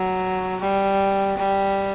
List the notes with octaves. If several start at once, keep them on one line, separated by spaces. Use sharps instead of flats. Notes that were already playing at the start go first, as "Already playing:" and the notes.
Already playing: F#3
G3
G3